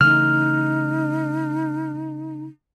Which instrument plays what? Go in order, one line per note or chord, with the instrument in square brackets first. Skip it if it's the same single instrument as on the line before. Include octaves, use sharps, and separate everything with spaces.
[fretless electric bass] C#3 E3 A3 [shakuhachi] D#4 [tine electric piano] F6